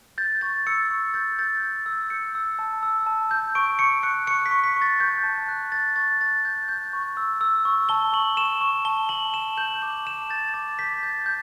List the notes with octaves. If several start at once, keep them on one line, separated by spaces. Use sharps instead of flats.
G6 A6
C#6 A6
E6 C#7
C#6
G6 A6
G6 A6
G6
E6
G6 C#7
E6
A5
E6
A5
G6
C#6 D7
C#6 C#7
F#6 C#7
C#6 C#7
B6
C#6
B6
C#6
A6
C#6 G6
A5
F#6
F#6 A6
C#6 A6
F#6 A6
G6
G6
C#6
E6
E6
C#6
A5 G7
C#6 F#7
C#6 E7
C#6
A5 G7
A5 F#7
A5 E7
G6 F#7
D6 F#7
A5 E7
G6 A6
D6 A6
G6 B6
G6 A6
G6